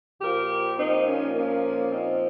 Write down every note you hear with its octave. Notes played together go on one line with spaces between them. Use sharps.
A#2 F3 G4 A#4
C4 D#4
A#3 C#4
A#3 C#4
C4 D#4